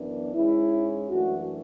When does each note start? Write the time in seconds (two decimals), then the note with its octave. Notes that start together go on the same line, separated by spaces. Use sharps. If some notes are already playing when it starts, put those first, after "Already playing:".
Already playing: F#2 E3 B3 D4
0.34 G#2 G#3 C#4 E4
1.10 F#2 E3 A3 D4 F#4